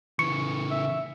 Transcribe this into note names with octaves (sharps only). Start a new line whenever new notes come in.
C#3 E3 C#6 C#7
E5